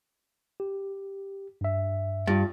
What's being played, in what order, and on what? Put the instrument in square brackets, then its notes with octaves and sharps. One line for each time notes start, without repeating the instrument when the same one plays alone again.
[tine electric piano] G4
G2 E5
[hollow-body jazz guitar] G2 [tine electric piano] F4 A6